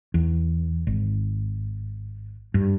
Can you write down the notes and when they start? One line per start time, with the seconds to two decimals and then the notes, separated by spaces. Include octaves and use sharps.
0.14 E2
0.87 G#1
2.54 G2